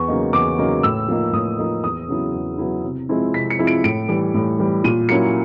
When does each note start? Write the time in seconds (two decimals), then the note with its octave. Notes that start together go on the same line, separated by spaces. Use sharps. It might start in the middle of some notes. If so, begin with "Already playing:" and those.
Already playing: E2 C#6
0.08 C#3 F#3 A#3 D#4
0.33 E2 D6
0.58 C#3 F#3 A#3 D#4
0.83 A2 E6
1.09 F3 A#3 D#4
1.33 A2 D#6
1.59 F3 A#3 D#4
1.83 E2 D#6
2.08 C#3 F#3 B3 E4
2.33 E2
2.58 C#3 F#3 B3 E4
2.84 C3
3.09 F3 G#3 C4 E4
3.34 C3 B6
3.50 C#7
3.59 F3 G#3 C4 E4
3.67 D7
3.84 A2 D7
4.09 E3 G3
4.34 A2
4.59 E3 G3
4.84 A#2 D#7
5.09 F#3 A#3 C#4 E4 C#7